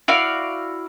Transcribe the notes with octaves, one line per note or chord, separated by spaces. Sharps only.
E4 F#4 D5 F5